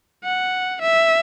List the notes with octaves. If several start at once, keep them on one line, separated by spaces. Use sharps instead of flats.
F#5
E5